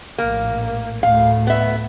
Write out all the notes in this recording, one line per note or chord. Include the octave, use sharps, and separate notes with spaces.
A#1 A2 A#3
D2 A2 A3 F5
B3 E5